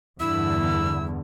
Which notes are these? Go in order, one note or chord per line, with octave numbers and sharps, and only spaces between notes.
E2 G2 D3 E4 E6